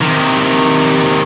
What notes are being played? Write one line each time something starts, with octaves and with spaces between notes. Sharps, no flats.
C3 D#3